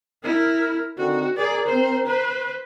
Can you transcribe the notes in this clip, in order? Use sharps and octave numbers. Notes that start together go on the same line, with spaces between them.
E4 A#4
D3 D#3 C4 F#4
G#4 A#4 D5
C4 C5
B4 C5